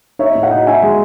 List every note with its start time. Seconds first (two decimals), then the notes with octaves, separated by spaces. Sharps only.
0.19 D#4 C#5 E5
0.35 A2
0.43 D#5 F#5
0.51 D#4
0.67 D#4 E5 G#5
0.83 G#3